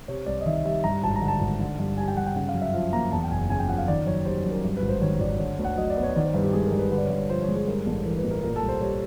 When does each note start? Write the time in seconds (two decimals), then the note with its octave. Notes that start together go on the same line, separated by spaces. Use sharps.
0.08 C3 C#5
0.26 C2 D5
0.41 D#5
0.46 D#3 E5
0.65 G3 E5
0.84 G2 A#5
1.03 G#1 A5
1.16 A#5
1.21 D3
1.28 A5
1.41 G#1
1.60 D3
1.79 G2
1.98 G3 G#5
2.08 G5
2.17 G2 F#5
2.26 G5
2.35 C#3 F#5
2.49 F5
2.54 F#2
2.62 E5
2.73 F3 F5
2.93 A#3 A#5
3.12 E2 A5
3.24 G5
3.31 F#1 G#5
3.50 C#3 G#5
3.59 G5
3.68 F3 F#5
3.78 F5
3.88 D#3 D5
4.06 F#2 C#5
4.26 G3 C5
4.45 F#2
4.51 A#4
4.64 G2
4.77 B4
4.82 G#1
4.89 C5
5.01 D#3 C#5
5.20 G#1 D5
5.39 D3 C#5
5.59 D2
5.64 F#5
5.77 F#3 D#5
5.90 D5
5.97 B3
6.03 C#5
6.16 D#3 D5
6.25 C5
6.34 G2 B4
6.44 G4
6.53 G#3 G#4
6.66 A#4
6.72 G2
6.79 B4
6.91 D3 B4
6.98 D5
7.05 C#5
7.10 G2
7.17 C#5
7.29 F3 C5
7.42 C#5
7.48 G#3
7.55 G#4
7.68 G2 A#4
7.86 A1 A4
8.06 E3 A#4
8.18 B4
8.24 A1
8.31 A#4
8.43 A#2 A#4
8.56 A4
8.63 C2
8.69 C5
8.81 G3 C#5